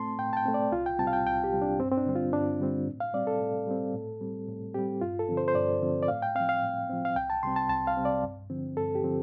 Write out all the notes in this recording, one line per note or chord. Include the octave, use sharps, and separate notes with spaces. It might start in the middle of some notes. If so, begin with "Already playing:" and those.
Already playing: A2 A3 C4 A5 C6
A2 G5
A5
G5
A3 C4
D5
C2 F4
G5
C3 G3 C4 A5
F5
G5
C2 G5
G4
C3 G3 C4
D4
G2 C4
C4
D4
D3 G3 C4
F4
G2 D4
D3 G3 C4
A2
F5
G3 C4 D5
A4
A2
G3 C4
A2
G3 C4
A2
G3 C4 G4
G2 F4
A4
D3 F3 C4
C5
C5
G2 D5
D3 F3 C4
D5
A2 F5
G5
F3 C4 F5
F5
A2
F3 C4
F5
C2 G5
A5
C3 G3 C4 C6
A5
C2 A5
F5
C3 G3 C4
D5
G2
D3 F3 C4
G2 A4
G4
D3 F3 C4